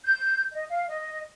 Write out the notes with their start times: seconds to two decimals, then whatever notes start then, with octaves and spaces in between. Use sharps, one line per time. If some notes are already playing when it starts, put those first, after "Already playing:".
0.04 G6
0.53 D#5
0.69 F5
0.88 D#5